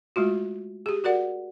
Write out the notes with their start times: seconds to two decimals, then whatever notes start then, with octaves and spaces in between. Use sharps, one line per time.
0.16 G#3 A3 F4 F#4
0.86 G4 G#4
1.04 F#4 A#4 D5 F#5